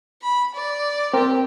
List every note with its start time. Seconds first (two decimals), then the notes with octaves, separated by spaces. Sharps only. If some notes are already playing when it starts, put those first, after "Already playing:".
0.22 B5
0.54 D5
1.14 C4 G4 A#4